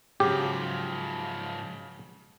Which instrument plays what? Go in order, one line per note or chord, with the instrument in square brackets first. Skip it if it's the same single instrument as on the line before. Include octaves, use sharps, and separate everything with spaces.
[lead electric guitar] G#2 F3 [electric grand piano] C#3 F#3 [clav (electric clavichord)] G4